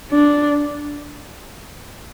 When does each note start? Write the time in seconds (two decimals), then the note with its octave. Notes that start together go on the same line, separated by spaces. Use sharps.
0.12 D4